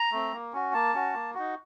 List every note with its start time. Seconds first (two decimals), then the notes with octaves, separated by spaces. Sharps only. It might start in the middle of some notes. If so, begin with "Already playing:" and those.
Already playing: A#5
0.12 A3 C4
0.33 A#3
0.53 C#4 F#4
0.74 A#3 A5
0.94 C#4 F#4
1.14 A#3
1.34 D#4 F#4